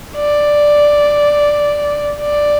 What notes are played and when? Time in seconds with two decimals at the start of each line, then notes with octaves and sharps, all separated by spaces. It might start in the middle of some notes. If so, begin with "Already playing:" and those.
0.16 D5
2.20 D5